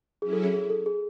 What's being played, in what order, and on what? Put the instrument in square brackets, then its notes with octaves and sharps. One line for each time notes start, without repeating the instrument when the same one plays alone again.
[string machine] F#3 C#4 E4 [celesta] G#4
[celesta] A4
G#4
G#4
A4
G#4